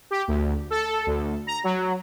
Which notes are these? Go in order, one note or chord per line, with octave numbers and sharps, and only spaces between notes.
G4
D2
A4
D2
A#5
F#3